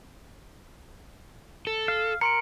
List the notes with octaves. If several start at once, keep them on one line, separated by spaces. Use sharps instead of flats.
A4
F5
A#4 A#5 C6 C#7 D7